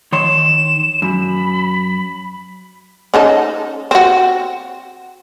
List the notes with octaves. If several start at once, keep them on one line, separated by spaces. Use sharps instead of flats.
D#3 C#5 C6 E7
F#2 B5
C#4 D#4 A4
C4 F#4